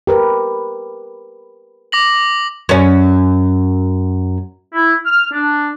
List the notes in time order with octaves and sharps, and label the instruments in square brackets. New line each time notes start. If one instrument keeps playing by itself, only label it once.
[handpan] G4 A#4 B4
[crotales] D6 A#6 F#7
[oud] F#2 C#4
[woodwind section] E4
F6
D4